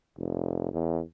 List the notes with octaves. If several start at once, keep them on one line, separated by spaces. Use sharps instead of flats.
F1
E2